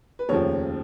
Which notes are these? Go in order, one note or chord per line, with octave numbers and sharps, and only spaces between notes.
B4
F1 D#2 C#3 F3 C#5